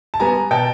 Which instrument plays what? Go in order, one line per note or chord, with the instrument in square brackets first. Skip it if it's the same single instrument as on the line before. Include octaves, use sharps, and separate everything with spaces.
[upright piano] A5
G3 B3 G#5 A#5
B2 G5 A5